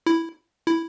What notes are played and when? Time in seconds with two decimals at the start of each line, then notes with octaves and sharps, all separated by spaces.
0.06 E4
0.67 E4